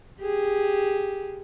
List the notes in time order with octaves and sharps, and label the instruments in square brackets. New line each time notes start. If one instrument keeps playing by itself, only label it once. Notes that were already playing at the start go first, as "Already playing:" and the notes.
[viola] G4 G#4